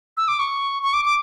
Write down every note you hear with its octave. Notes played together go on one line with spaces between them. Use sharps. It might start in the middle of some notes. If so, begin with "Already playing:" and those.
E6
D6
C#6
C#6
D6
D6